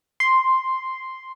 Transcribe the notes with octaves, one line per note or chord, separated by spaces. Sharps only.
C6